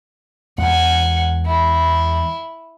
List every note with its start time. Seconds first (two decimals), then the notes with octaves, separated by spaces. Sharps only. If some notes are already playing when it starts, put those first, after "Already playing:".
0.58 E2 G#3 B3 F#5 G#5
1.46 E4